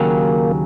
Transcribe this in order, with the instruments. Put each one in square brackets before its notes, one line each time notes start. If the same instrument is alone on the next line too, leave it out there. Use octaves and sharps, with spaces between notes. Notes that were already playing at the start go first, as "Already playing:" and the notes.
Already playing: [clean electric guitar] D#2 C#3 F#3 [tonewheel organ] A#3